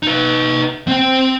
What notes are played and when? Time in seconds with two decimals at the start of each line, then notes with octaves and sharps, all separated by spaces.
0.03 D#4 B4
0.88 C4 G5